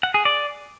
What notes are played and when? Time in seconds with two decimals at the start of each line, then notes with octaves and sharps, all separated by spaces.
0.03 F#5
0.14 G#4
0.25 D5